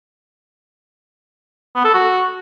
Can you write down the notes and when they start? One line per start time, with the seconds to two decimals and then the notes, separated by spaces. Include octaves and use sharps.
1.75 B3
1.85 A4
1.94 F#4